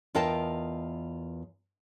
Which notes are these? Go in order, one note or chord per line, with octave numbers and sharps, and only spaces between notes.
E2 F4 A#4 D#5 G5 A5